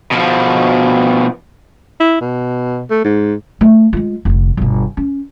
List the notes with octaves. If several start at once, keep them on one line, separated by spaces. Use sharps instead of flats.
B2 F3
E4
B2
A3
G#2
A3
G#3 F4
F1 D3
G1 B2
C#4